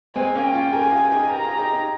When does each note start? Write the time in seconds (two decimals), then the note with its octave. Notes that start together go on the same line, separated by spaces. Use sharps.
0.16 G#3 C4 G#5
0.35 A#3 C#4
0.44 G5
0.54 C#4 F4
0.73 G4 A#4 G#5
0.92 F4 G#4
1.11 D#4 G4
1.30 G4 A#4 A#5
1.44 F4 G#4
1.59 D#4 G4
1.73 D#4 G4